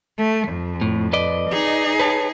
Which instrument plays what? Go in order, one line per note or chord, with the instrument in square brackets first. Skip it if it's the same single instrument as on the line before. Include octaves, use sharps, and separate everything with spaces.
[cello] A3
F2
[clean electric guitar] A2
B4 D5 D#5
[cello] D#4 G#4
[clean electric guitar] B4 C#5 A5